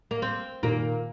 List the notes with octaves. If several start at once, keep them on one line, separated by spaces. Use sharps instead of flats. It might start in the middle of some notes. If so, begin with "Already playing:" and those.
A#3
C4
A#2 D#3 A#3